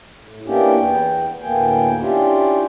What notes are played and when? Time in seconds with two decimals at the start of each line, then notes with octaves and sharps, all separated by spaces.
0.20 A2
0.47 A#3 B3 C#4 D4 E4 G4
0.77 E2 B3 G5
1.42 D2 A2 A#3 B3 G5 G#5
2.00 C#4 D4 E4 F4 G4